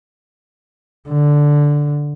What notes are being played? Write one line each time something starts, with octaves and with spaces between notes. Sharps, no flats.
D3